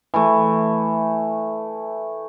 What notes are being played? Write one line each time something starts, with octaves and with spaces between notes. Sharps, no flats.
E3 A3